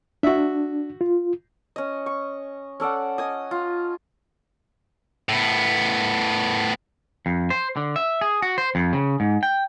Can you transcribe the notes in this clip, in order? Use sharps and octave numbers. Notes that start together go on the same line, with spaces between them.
D4 F#4 E5
F4
C#4 D#5
C#6
C#4 A4 D5 F#5
D#5 G#5 D#6
F4
A2 B3
F2
C5
D3
E5
G#4
F#4
C5
F2
C#3
G#2
G5